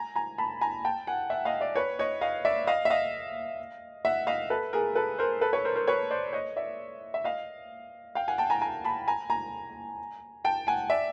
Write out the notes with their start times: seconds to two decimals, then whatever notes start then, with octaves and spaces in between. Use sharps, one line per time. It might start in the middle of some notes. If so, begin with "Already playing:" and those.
Already playing: G#5 A#5
0.16 G#5 A#5
0.38 A5 B5
0.61 G#5 A#5
0.85 G5 A5
1.07 F#5 G#5
1.30 E5 F#5
1.45 D#5 F5
1.61 D5 E5
1.76 B4 C#5
1.99 C#5 D#5
2.21 D#5 F5
2.45 D5 E5
2.67 D#5 F5
2.85 E5
2.90 D#5 F5
4.05 E5 F#5
4.27 D#5 F5
4.50 A4 B4
4.73 G#4 A#4
4.95 A4 B4
5.18 A#4 C5
5.41 A4 B4
5.53 B4 C#5
5.65 A#4 C5
5.75 A#4 C5
5.87 B4 C#5
6.11 C5 D5
6.33 C#5 D#5
6.56 D5 E5
7.14 E5
7.24 D#5 F5
8.15 F5 G5
8.28 F#5 G#5
8.38 G5 A5
8.50 G#5 A#5
8.61 G#5 A#5
8.85 A5 B5
9.07 G#5 A#5
9.30 G#5 A#5
10.44 G5 A5
10.67 F#5 G#5
10.90 D5 E5